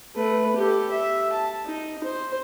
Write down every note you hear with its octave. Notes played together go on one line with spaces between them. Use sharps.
A3 B4
G4 A4
E5
A5
D#4
C5